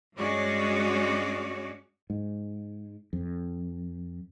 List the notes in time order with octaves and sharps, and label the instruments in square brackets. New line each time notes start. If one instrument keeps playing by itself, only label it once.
[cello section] G2 G#3 C#4 F#4 C#5 D5
[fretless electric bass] G#2
F2